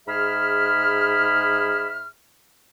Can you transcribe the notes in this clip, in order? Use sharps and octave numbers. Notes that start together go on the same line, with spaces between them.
G#2 G#4 E5 B5 F6